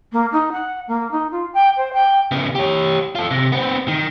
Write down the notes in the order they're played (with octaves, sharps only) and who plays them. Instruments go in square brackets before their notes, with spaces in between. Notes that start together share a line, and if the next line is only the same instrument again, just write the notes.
[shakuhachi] A#3
D#4
F#5
A#3
D#4
F4
G5
C5
G5
[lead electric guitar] C#3 B3
G4 C#5
F4 A4
C3
B3 C4
D#3